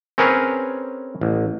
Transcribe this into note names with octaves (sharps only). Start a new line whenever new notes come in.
C4 C#4 G#4 A#4 B4 C#5
A1